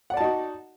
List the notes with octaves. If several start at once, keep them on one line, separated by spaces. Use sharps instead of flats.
D#4 F#4 D5 F#5 A5